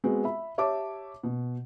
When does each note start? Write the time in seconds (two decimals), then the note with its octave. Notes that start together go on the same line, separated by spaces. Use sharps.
0.04 G#3 B3 C4 F#4
0.24 E5 B5
0.58 G4 C#5 E5 A5 D6
1.23 B2